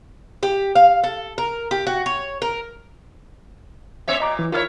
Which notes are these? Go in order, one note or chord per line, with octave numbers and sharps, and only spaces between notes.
G4
F5
A4
A#4
G4
F#4
C#5
A#4
B3 C#5 E5
A#2 D#5 A#5 D6
E3
D#3 E4 F4 A#4 C#5 F6